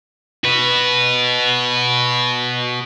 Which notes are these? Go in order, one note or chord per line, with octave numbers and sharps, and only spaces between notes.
F#4 B4